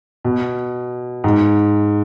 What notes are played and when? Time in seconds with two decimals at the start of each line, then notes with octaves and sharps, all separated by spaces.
0.25 B2
1.24 G#2